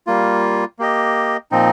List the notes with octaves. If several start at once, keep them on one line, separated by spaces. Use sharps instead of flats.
G3 A#3 F4
A#3 G4 D#5
A#2 F3 C4 D#4